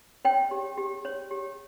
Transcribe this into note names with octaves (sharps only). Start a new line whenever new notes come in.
C#5 G5
G4
G4
C#5
G4